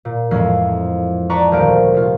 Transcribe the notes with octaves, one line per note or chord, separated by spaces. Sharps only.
A#2
F2 A2 E3 F3 G#3 C7
B4 D5 A5 A#5 C#6
D#1 D2 A#4 C5 F5 D7
C3 F4